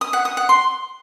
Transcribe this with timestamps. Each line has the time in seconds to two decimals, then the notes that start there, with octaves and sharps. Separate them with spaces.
0.01 D#6
0.13 F#5
0.25 D#6
0.37 F#5
0.49 C6